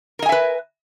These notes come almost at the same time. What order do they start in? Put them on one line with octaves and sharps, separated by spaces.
A#4 D#5 G#5 E5 B4